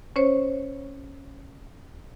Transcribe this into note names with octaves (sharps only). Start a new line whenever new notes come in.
C#4 C5 C#5